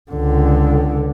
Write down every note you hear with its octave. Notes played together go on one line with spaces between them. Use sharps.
C#2 D3